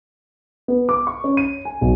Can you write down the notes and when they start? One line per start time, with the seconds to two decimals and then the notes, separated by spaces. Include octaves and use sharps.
0.68 B3
0.89 D6
1.07 C#6
1.24 C#4
1.37 D#7
1.65 G#5
1.81 B1